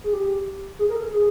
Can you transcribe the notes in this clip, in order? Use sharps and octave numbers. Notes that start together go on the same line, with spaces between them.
G#4
G4
G#4
A#4
A4
G#4